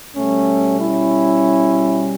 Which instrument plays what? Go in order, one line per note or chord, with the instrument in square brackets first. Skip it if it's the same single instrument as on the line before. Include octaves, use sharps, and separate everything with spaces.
[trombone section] B2 G3 A3 C#4
C#4 E4